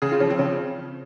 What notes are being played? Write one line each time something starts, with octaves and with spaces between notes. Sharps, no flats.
C#3 G#4
F4
F3 C#4
C4
C#3 C#4